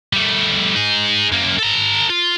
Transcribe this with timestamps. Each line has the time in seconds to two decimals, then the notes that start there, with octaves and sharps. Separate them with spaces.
0.13 G3 A3
0.75 D#4 G#4
1.32 F#2 A#3
1.58 A4 A#5
2.09 F4